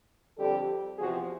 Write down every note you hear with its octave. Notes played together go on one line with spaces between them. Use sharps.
F2 D3 G3 G4 A4
E2 C3 F3 F#4 G#4